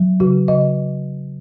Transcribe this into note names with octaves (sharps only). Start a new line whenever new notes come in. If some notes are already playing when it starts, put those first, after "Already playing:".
Already playing: F#3
C#3 F#4
C#3 D#5